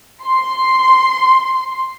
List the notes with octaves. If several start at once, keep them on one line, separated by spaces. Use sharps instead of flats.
C6